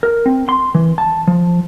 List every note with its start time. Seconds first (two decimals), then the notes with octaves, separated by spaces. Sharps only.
0.03 A#4
0.26 C4
0.49 C6
0.75 E3
0.98 A5
1.27 F3